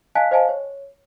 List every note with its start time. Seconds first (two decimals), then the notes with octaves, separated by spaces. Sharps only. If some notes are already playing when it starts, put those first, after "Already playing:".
0.15 D#5 F5 G#5 A5 F#6 B6
0.31 C5 D#5 F5 G#5 A5
0.49 C#5